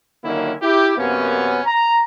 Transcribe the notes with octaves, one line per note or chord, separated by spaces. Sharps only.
D3 D#3 F#3 A#3 C#4 E4
E4 G4
F#2 C3 A#3 B3 C#4
A#5